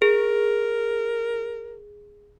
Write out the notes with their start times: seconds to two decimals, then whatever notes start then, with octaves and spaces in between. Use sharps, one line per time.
0.02 G#4 A#4